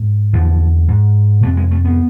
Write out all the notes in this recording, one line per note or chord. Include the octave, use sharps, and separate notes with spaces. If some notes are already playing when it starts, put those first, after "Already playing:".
Already playing: G#2
E2 D3 F3
G#2
F2 C3 A3
G#3
A3
B3